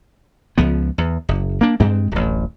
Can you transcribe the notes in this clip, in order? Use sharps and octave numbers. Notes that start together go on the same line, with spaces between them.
C#2 F3 B3
E2
F#1
A#3 D4
G2 G#3 C4
D1 A1